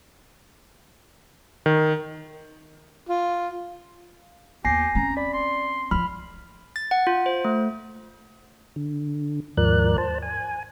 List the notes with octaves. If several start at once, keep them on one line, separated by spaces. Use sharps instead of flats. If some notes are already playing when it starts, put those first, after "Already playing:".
D#3
F4
D#2 B3 G4 G#5 A#6 C7
C4 C#4 A#5
D5 B5
C6
F3 F4 B5 F6
A6
F#5
F4
C5
A3
D3
D#2 G#2 F3 A#4 D5 F#6
C5 A5
G#5